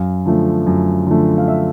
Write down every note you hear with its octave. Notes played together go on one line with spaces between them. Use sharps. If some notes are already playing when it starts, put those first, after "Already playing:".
Already playing: F#2 F5
D3 F3 A3
F#2
D3 F3 A3
F5
E5